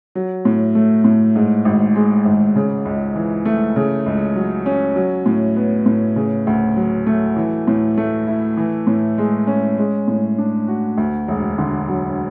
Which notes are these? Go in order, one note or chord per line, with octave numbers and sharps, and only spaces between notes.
F#3
A2
A3
A2
G#2
G#1
G#3
G#1
C#3
C#2
E3
A3
C#3
C#2
F#3
C#4
F#3
A2
B3
A2
C#3
D2
F#3
A3
E3
A2
A3
E4
E3
A2
G#3
C#4
G#3
A2
D4
F#4
D2
E1
D3
F#3